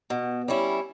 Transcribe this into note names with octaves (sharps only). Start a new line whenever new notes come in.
B2
G3 C#4 E4